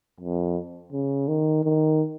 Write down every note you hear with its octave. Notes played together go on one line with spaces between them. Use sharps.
F2
C#3
D#3
D#3